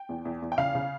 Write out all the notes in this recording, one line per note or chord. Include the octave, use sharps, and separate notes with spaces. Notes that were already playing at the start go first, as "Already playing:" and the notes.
Already playing: G5
E2
E2
E2
G5
C#3 F5
C#3